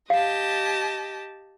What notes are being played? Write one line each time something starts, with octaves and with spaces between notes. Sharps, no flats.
G4 D#5 F5 A5